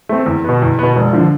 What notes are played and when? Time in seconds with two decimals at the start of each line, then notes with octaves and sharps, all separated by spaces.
0.09 A3 C4
0.26 E2
0.44 B2 B3
0.62 E2
0.79 B2 B3
0.96 E1
1.13 D3 F3